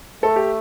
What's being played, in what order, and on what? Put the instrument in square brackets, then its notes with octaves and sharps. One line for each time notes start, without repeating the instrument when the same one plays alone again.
[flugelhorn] A3 [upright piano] A4
[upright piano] G4